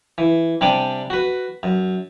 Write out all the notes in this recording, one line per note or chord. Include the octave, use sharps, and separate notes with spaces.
E3
C3 G3 D4 G#5 D6
F#4 B4
F#2